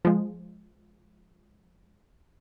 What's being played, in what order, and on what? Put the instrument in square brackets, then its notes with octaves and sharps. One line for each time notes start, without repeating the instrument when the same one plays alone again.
[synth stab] F3 G#3